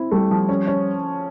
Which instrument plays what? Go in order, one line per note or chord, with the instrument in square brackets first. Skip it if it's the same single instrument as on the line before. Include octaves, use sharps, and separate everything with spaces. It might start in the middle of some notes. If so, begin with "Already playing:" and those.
Already playing: [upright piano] C4 E4
[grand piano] G3 [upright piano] A3
[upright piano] F3
C#4
C#4